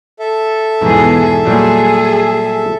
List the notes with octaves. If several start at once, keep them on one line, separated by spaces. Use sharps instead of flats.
A4 E5
E2 G#2 B2 G#4
A#2 F#3 G3 G#4